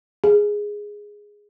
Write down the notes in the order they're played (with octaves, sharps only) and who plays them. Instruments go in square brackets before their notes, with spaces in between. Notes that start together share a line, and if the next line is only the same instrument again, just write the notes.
[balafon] G#4